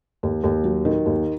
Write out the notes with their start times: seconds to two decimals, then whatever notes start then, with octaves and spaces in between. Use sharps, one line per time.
0.23 D#2
0.44 D#2
0.64 F#3
0.85 D#3
1.06 D#2